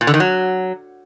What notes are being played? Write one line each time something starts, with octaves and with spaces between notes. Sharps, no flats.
A#2
D3
D#3
F#3